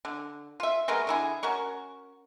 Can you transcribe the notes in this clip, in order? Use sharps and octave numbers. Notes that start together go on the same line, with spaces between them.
D3
F4 E5
G#3 A3 B3 A#4
D3 E4 G#4
C#4 F#4 A#4 C#6